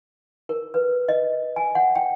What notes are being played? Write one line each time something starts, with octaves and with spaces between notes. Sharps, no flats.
A#4
B4
D#5
G#5
F#5
G5